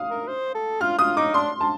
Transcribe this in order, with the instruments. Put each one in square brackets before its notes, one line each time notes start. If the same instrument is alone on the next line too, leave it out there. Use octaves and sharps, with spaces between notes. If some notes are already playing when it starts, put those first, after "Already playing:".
Already playing: [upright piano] F5 D#6
[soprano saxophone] A#4
C5
A4
[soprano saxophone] F4 [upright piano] F6
[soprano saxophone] F4 [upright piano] D#6
[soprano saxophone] D#4 [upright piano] D6
[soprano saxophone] D4 [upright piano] C6
[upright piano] A5